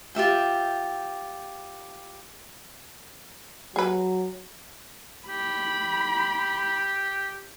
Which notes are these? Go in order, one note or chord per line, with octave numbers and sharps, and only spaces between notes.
F4 G4 E5 G5
F#3 G#4 B4
G4 B5